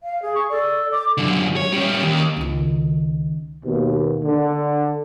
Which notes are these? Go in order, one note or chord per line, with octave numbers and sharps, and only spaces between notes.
F5
G#4
C#6
A4 D5
D6
F#2 D3
C#5
G3 C#4
D#2
C#2 D#3
D#2 B2
D3